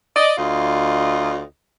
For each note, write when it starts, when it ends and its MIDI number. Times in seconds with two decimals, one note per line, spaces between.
0.16 0.32 74
0.16 0.32 75
0.38 1.43 38
0.38 1.43 65
0.38 1.43 75